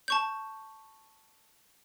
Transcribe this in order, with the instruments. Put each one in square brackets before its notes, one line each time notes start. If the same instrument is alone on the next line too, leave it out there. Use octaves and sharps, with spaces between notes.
[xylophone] A5 C#6 G6